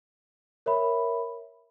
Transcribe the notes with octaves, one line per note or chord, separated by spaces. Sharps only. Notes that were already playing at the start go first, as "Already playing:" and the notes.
A#4 C#5 E5 B5